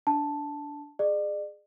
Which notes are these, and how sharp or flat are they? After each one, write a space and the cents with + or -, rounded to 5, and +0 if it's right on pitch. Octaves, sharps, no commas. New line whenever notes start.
D4 -15 A5 +0
G#4 +0 D5 +40